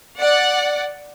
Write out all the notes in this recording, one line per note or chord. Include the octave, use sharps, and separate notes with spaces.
D5 F#5